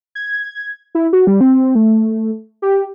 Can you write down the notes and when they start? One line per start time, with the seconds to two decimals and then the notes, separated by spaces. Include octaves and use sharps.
0.15 G#6
0.95 E4
1.13 F#4
1.27 G3
1.41 C4
1.75 A3
2.62 G4